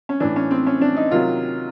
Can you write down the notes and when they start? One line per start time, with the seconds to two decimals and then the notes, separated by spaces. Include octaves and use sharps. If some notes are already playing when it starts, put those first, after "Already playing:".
0.09 C#4
0.20 A2 E3 D4
0.36 C#4
0.51 C4
0.67 C#4
0.81 D4
0.97 D#4
1.11 C3 D#3 F#3 F4